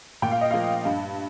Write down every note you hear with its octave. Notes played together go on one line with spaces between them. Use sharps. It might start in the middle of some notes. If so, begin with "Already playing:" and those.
A#2 G5
F5
D#5
F3 A#3 F5
G2